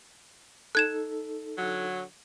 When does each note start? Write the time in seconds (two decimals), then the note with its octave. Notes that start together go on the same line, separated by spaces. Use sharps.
0.75 D#4 A4 F#6 G#6 E7
1.58 D3 F#3